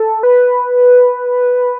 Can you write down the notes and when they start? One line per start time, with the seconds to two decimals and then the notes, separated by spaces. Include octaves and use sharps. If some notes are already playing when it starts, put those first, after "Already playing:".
Already playing: A4
0.23 B4